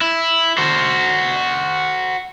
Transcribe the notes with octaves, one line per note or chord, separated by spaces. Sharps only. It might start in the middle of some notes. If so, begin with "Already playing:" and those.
E4
F#4 C5